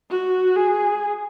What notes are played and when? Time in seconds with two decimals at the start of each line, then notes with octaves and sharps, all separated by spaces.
0.11 F#4
0.56 G#4